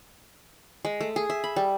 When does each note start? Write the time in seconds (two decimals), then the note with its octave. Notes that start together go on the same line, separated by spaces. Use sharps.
0.85 G#3
1.01 A3
1.16 G#4
1.30 E5
1.44 B5
1.56 G3